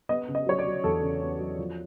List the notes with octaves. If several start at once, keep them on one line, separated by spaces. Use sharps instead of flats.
B3 D#5
C#3
D#5
F#3 C#5
D5
F#3
E2 A4
C#3
B3
F#3
F3